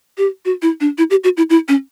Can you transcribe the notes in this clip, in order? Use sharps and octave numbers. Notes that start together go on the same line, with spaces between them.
G4
F#4
E4
D4
E4
G4
F#4
E4
E4
C#4